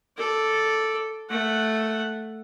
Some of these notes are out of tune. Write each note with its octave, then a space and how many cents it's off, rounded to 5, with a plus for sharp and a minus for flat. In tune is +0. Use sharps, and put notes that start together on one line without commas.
A4 +0 D5 +0
A3 +0 F#5 +0